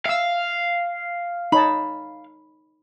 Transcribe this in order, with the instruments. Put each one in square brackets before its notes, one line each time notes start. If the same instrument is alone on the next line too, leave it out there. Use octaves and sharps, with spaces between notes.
[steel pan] E5 E6 [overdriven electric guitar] F5
[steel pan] D#4 C#5 A5 [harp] B5